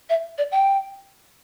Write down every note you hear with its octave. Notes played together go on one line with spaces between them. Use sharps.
E5
D5
G5